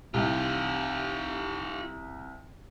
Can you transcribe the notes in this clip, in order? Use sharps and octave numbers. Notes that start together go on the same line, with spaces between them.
C2 F4 G4